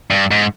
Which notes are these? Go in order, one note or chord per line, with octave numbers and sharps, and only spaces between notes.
G2
G#2